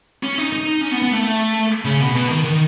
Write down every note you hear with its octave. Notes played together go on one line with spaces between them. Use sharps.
C#4
D#4
D#4
C#4
B3
B3
A3
C#3
B2
B2
D#3
D#3